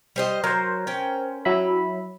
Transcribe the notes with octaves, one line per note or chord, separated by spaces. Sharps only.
G3 C5 D#5
F#3 A#4 C5
C#4 G5
F#3 E4 B5